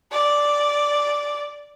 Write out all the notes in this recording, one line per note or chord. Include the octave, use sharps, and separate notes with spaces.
D5